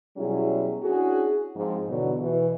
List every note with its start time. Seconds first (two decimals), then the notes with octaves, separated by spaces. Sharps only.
0.17 B2 F#3 G3 C#4 E4 G#4
0.83 C#4 D4 E4 F#4 G#4
1.56 G#2 F3 C4
1.88 E2 B2 D3 F#3
2.21 B2 E3